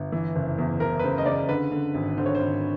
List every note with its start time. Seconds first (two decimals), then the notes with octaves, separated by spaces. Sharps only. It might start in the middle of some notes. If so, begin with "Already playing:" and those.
Already playing: G1
0.12 E3
0.36 F#1
0.58 E2
0.80 F#1 A#4
0.99 B4
1.04 C#3 C5
1.18 D#5
1.26 C#3 D5
1.49 D3 B4
1.72 D3
1.94 G#1
2.18 D3 C5
2.26 C#5
2.35 C5
2.40 G#1